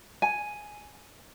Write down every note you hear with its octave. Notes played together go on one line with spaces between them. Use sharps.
G#5